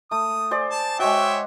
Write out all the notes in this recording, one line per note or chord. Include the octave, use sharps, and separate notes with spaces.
A3 D#6
G#4 C5 D5
A5
G#3 F#4 C#5 E5 G5